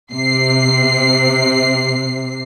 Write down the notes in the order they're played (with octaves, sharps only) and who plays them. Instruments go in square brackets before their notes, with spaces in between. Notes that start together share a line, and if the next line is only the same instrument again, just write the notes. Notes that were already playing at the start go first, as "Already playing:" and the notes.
[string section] C3 C7